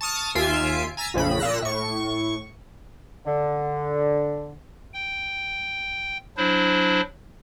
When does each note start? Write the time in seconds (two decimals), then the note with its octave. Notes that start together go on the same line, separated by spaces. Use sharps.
0.01 A5 C#6 D#6 F6
0.35 D#2 F4 E5 G#5 C7 D7
0.97 G#5 A#5 E6 A6 B6
1.14 A#1 F2 C#3 B5
1.39 A#2 E6 F#6 A#6
1.62 A2 C#6
3.26 D3
4.94 G5
6.37 F#3 D4 E4 C5